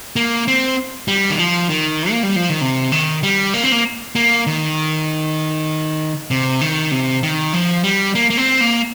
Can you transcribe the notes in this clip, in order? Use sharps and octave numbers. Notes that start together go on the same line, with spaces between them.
A#3
C4
G3
D#3
F3
D#3
A#3
G3
F3
D#3
C3
D#3
G3
A#3
C4
A#3
A#3
D#3
C3
D#3
C3
D#3
F3
G3
A#3
A#3
C4
A#3